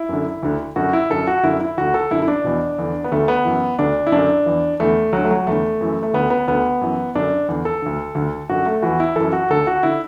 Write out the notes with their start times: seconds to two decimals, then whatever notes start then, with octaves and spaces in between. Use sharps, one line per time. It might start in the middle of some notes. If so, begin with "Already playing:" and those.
Already playing: E4
0.09 F#2 D3
0.43 D2 D3
0.76 F#2 D3 F#4
0.93 E4
1.10 F#2 D3 A4
1.27 F#4
1.43 F#2 D3 E4
1.60 E4
1.78 D2 D3 F#4
1.94 A4
2.11 F#2 D3 E4
2.22 E4
2.28 D4
2.44 E2 B2
2.78 E2 D3
3.04 B3
3.12 D2 D3 A3
3.28 B3
3.45 F#2 E3
3.79 D2 D3 D4
4.07 E4
4.12 F#2 D3 D4
4.46 E2 E3
4.80 E2 D3 A3
5.13 D2 D3 F#3
5.24 A3
5.31 F#3
5.47 E2 D3 A3
5.81 F#2 E3
6.03 A3
6.14 D2 D3 B3
6.30 B3
6.48 D2 D3 B3
6.81 F#2 E3
7.15 F#2 D3 D4
7.48 E2 D3
7.65 A4
7.82 D2 D3
8.15 D2 D3
8.49 F#2 D3 F#4
8.66 A3
8.82 E2 E3 F#4
9.00 E4
9.16 F#2 E3 A4
9.33 F#4
9.50 D2 D3 A4
9.67 F#4
9.83 D3 E4